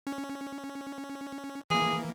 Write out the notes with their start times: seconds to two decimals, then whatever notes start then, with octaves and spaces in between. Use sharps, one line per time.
0.07 C#4
1.70 E3 A#3 G#4